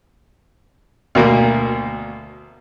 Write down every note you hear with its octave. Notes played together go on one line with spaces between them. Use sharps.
D2 B2 A#3